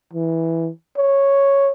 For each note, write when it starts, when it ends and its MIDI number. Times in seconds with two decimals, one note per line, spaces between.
0.14 0.69 52
0.98 1.72 73